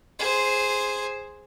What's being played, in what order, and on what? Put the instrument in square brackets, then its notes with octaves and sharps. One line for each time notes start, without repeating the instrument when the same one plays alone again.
[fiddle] G#4 C5